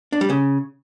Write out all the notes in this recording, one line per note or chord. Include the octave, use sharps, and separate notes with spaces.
D4
G3
C#3